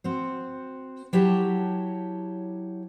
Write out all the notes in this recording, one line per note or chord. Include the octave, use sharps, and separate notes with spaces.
C4 F#4 C5
F#3 E4 G4 C#5 A5